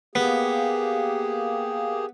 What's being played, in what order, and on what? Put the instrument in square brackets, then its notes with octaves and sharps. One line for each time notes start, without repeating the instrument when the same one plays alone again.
[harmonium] A#3 G4 G#4 [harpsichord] B3